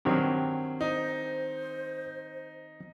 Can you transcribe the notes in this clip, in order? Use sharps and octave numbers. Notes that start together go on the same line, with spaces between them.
G2 D#3 F#3 C4 G4
D#4 C5